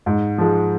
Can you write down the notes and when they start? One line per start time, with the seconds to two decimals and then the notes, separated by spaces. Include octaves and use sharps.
0.06 G#2
0.38 F3 G#3